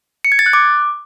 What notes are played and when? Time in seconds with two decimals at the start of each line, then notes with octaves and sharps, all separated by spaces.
0.25 C#7
0.32 G#6
0.39 A6
0.46 F#6
0.53 D6